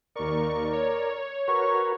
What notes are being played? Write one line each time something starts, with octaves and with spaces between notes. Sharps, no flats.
D#2 A#4 D5 C#6
C#5
F#4 A#4 B4 C#6